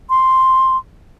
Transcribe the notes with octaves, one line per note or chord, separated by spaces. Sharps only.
C6